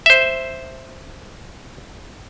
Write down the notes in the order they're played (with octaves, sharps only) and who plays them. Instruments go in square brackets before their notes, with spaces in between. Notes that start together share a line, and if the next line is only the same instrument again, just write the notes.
[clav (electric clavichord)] C5 E5